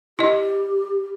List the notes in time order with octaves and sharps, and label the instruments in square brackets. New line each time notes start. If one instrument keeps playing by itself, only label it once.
[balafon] E4 D#5 [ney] G4